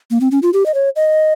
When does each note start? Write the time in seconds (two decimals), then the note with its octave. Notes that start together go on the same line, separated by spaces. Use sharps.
0.11 A#3
0.21 C4
0.31 C#4
0.43 F4
0.53 G4
0.66 D#5
0.74 C#5
0.96 D#5